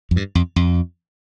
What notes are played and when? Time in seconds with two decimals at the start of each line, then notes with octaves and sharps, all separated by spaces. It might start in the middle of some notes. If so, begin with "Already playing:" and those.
0.11 F2
0.16 G2
0.35 F2
0.56 F2